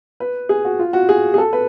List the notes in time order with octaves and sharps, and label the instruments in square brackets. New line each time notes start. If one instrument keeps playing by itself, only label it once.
[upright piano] B4
G#4
F#4
F4
F#4
G#4
G#4
A4
B4